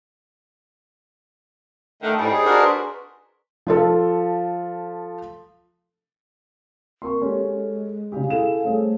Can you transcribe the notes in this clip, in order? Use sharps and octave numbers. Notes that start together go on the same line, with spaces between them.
D3 D#3 A3
A2 G3 C4 D#4 G#5
G#4
D4 F#4 A#4
B4 C6
F3 F4 A4
A#3 C4 A#4 C6 C#6
G#3 C#4 G4 A4
C#3 G4 F5 G#5
E4 G#4 A4 E7
G3 A3 C#4 G#4 C5